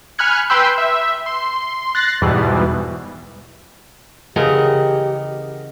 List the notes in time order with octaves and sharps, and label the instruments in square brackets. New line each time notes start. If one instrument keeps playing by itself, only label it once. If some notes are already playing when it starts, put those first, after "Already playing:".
[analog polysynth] G#5 B5 F6 F#6 G#6 C#7
B4 G5 B5 C6 E6 G6
E5
C6
F#6 A6 A#6 C7
E2 G#2 B2 E3 G3
[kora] C#3 E3 G#3 [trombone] G4 [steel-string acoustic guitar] A#4 D#5 F#5